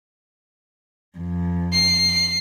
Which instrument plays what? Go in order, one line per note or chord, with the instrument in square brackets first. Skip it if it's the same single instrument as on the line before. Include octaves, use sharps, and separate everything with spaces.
[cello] F2
[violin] C7